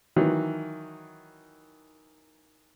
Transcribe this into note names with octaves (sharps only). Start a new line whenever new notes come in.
D#3 E3 F#3